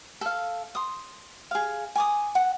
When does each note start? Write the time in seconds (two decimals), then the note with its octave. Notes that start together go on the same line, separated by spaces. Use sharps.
0.21 A4 F5
0.75 C6 D#6
1.51 G#4 F5
1.95 G#5 D6 D#6
2.35 F#5